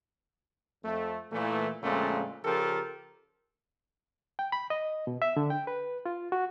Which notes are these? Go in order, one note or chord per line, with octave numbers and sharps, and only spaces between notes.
F2 A3
A#2 E3 A3
F2 A#2 D3 G#3 A3 C#4
C#3 F3 F4 G4 A4 A#4
G5
B5
D#5
B2
E5
D3
G5
B4
F4
F#4